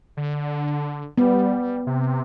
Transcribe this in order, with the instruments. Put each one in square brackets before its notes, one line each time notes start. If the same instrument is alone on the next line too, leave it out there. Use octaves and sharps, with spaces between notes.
[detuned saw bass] D3
[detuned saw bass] G3 [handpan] B3
[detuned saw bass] C3